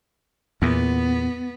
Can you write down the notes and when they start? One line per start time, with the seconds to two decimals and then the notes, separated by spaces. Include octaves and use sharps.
0.62 E2 A#2 B3